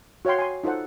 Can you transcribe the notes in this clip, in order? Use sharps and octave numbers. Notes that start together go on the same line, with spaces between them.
F#4 C#5 F5 G5 C6
G#5 C6
D#4 F4 A4 C5 F#5